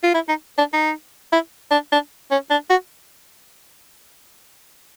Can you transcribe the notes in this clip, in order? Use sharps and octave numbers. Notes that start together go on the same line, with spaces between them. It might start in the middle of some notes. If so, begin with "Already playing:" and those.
F4
E4
D#4
D4
D#4
E4
D4
D4
C#4
D4
F#4